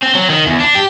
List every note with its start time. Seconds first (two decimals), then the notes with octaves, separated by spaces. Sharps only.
0.03 C4
0.15 F#3
0.30 D#3
0.46 E2
0.60 D4
0.75 G4